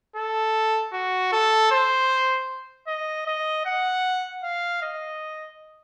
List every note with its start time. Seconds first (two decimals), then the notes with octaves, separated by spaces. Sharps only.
0.16 A4
0.93 F#4
1.33 A4
1.71 C5
2.88 D#5
3.27 D#5
3.66 F#5
4.44 F5
4.82 D#5